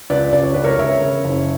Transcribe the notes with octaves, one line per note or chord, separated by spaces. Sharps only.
C#2 B4 D5
C#2 D5
C#5
C#2 B4
A#4 C#5
C#3 C#5 E5
C#3
F#1